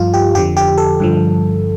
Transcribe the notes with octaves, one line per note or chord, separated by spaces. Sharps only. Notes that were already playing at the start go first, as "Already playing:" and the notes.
Already playing: G2 F3 F4
G4
F2 D3 F3 G4
G4
A4
G2 D3 F3